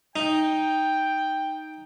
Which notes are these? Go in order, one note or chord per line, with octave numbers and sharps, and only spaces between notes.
D#4 G5